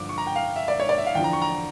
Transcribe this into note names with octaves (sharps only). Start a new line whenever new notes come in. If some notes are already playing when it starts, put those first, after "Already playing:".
Already playing: G2 D3 F3 D6
C#6
A#5
G5
F5
E5
D5
C#5
D5
E5
F5
E2 D3 F3 G5
A#5
C#6
A#5